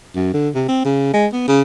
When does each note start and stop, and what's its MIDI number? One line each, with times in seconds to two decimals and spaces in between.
0.15 0.29 42
0.34 0.49 50
0.55 0.64 48
0.69 0.80 60
0.85 1.09 49
1.13 1.27 56
1.33 1.45 59
1.48 1.62 49